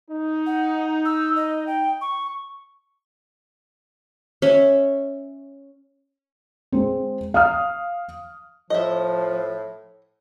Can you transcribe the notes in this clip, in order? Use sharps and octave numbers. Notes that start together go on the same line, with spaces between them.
D#4
F#5
E6
D#5
G5
C#6
C#4 E5
G#3 C4
F5 D#6 F6
A2 F3 D#5 E5